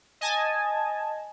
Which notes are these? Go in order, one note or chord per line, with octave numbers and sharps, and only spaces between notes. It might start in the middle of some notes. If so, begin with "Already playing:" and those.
D#5 G#5 A5